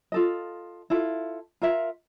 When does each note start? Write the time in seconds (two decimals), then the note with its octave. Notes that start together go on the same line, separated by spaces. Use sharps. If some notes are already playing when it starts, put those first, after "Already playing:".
0.12 F4 A4 D#5
0.90 E4 F4 A4
1.62 F4 A#4 E5